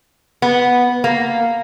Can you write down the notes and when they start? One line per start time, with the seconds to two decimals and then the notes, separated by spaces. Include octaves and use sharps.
0.42 B3
1.04 A#3